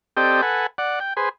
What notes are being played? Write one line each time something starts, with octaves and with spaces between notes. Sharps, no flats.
C4 G4 A4 D5 D#5 G5
A4 B4 F#5 G#5
D5 F#5
G5
G#4 B4 C5